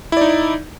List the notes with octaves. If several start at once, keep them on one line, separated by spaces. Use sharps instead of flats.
D#4 E4 D5